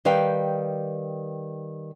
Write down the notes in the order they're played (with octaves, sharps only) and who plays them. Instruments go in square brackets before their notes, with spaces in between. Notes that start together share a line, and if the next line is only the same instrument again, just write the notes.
[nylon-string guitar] D#3 G3 B4 F5 G5